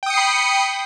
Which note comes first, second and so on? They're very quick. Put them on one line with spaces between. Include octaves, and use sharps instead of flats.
G5 D#6 C#7 C7 B5